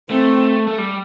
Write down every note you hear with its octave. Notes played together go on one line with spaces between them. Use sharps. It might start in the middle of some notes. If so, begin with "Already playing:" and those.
A3 C4
A3
G3